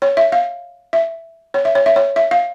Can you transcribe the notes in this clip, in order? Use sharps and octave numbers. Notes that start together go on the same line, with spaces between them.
C#5
E5
F5
E5
C#5
E5
C#5
E5
C#5
E5
F5